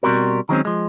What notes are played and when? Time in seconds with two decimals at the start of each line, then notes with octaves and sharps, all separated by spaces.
0.03 B2 G3 C4 F#4 G4 A#4
0.49 D#3 F#3 G#3 A#3 C4 C#4
0.65 F3 G#3